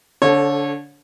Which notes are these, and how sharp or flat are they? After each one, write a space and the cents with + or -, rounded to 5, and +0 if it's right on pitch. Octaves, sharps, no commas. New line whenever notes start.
D3 -30 A4 +0 C#5 -20